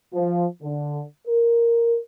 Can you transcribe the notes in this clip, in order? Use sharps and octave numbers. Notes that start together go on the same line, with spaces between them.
F3
D3
A#4